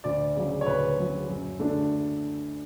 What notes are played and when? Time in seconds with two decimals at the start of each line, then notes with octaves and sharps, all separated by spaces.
0.04 D2 D5
0.36 C#3 F#3
0.61 C#5
0.66 D2 B4
0.97 C#3 F#3
1.29 F#2
1.59 D3 A3 D4